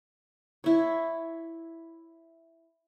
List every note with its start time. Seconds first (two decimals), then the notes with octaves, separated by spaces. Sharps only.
0.64 E4 C#5